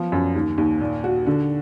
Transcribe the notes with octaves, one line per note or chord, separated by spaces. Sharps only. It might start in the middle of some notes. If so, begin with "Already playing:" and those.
Already playing: F3 B3
F#2
D#2
D#2
A#2
F#4
D3